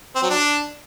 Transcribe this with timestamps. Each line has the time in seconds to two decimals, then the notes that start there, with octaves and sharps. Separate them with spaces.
0.15 C4
0.23 F#3
0.30 D4